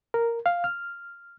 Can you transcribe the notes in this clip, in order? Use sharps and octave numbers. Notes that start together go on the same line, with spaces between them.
A#4
F5
F6